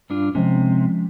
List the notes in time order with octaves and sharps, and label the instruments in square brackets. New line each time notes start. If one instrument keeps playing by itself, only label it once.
[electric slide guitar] G2 D4 F4
[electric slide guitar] C3 [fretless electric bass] F3 G#3 C#4